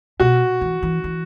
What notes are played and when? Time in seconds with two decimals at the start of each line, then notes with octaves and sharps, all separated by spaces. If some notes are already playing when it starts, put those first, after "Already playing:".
0.20 B2 F#4
0.61 E3
0.82 E3
1.04 E3